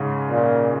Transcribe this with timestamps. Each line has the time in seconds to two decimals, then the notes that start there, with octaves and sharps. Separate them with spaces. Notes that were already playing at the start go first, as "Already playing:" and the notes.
Already playing: G#2 C#3
0.30 A#2